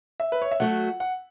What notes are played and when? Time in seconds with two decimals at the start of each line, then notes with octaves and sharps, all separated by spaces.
0.20 E5
0.32 B4
0.42 C#5
0.52 E5
0.60 F#3 A3 F#4 F#5
1.00 F#5